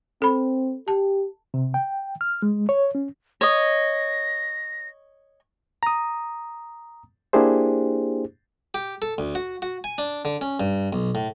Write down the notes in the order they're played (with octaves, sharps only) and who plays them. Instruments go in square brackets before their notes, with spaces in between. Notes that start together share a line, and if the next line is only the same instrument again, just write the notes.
[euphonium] C4 [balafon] A4 B5
[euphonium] G4 [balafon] A5
[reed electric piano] C3
G5
F6
G#3
C#5
C#4
[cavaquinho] C#5 D#5 [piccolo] A#6
[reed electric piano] A#5 D#6
A#3 D4 E4 G4 G#4 C5
[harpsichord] G4
A4
D2
F#4
F#4
G#5
D4
D3
C#4
G2
B1
A2